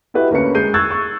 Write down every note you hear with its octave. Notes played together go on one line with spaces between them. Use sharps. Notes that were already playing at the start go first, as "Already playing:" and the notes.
E4 F#4 G4 B4 D#5 E5
D2 A#3 C#4 B4 C#7
G#3 G6 C7 D#7
C#6 E6 F#6 G#6 A6
C#6